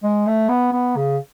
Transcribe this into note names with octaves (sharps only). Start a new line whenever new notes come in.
G#3
A3
B3
B3
C#3